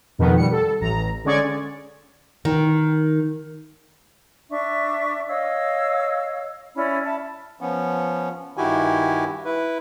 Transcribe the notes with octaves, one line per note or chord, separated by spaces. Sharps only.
F2 B2 D#3 B3
G3 C#7
A4
A1 A#5
D3 G#3 C#4 D5 C#6 G#6
D#3
D4 E5 C#6
C#5 D#5 F5 E6
C#4 E4 D5 B5
E5 A5 B5
F3 B3 C#4
G2 D#3 E4 F#4 G4 G#5
E4 B4